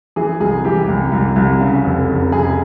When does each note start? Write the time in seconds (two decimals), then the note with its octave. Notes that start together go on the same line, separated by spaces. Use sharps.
0.16 E3 G#4
0.40 C2 G#4
0.65 E3 G4
0.88 C2
1.12 C2
1.36 C2
1.61 C#3
1.84 F1
2.08 F1
2.32 F1 G#4